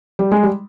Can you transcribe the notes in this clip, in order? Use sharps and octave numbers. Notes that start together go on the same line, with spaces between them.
G3
G#3
G3